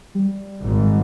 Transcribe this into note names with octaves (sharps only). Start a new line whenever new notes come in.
G3
G#1